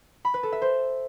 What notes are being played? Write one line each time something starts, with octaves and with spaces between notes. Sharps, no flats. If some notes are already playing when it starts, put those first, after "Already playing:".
B5
B4
A4
E5
C5